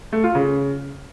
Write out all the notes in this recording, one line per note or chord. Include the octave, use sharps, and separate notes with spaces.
A3
F4
C#3